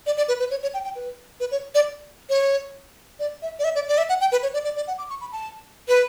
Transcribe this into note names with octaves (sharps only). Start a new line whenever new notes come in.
D5
D5
B4
B4
C#5
C#5
G5
G5
B4
B4
C#5
D5
C#5
D5
E5
D5
E5
D5
D5
E5
F#5
G5
B4
C#5
D5
D5
D5
F#5
D6
C#6
B5
A5
B4